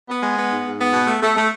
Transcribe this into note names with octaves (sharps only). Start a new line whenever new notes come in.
B3
G#3
B3
G#2
G#2
B3
B2
A3
A3
A3